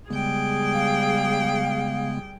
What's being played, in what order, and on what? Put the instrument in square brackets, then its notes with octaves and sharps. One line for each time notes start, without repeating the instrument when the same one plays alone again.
[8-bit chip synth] C#3 G#3 B3 [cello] G3 G5 [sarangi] G#4
[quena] F5